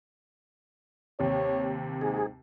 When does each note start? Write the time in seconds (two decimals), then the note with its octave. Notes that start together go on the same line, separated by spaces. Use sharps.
1.19 D#2 C3 C#5
2.01 G#2 G#4